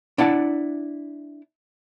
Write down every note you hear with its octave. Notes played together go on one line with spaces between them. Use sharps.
D4 E4 F#5 A5